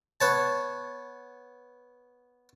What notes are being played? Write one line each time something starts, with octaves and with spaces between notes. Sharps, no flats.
B3 C#5 A5